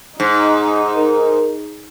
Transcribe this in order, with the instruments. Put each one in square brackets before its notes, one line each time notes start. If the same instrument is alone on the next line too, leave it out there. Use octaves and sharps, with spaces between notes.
[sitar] G#2 [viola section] D#4
[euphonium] A#4